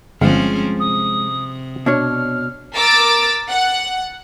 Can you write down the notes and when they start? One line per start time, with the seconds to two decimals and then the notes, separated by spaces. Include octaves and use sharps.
0.21 G1 F3 G#3 C4 C#4 F5
0.80 C3 D#6
1.86 B2 D4 C#5 F6
2.76 A#4 D6 E6 A6 D7
3.50 F#5